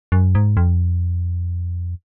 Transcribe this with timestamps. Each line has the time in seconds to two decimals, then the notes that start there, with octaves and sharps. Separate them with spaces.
0.12 F#2
0.35 G#2
0.57 F2